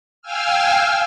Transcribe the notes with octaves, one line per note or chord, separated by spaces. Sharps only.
F5 G5 G#5 E6 F6